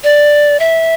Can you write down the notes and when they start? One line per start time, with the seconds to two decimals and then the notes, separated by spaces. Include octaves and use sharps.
0.04 D5
0.60 E5